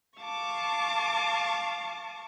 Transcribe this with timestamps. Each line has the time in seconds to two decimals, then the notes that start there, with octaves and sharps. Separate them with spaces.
0.20 F5 A5 C#6 D6